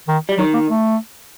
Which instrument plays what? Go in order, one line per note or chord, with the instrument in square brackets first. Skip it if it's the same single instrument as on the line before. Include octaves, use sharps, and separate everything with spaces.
[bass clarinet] D#3
[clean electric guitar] G3
[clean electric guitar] D#3 [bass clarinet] F#3
[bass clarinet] A#3
A3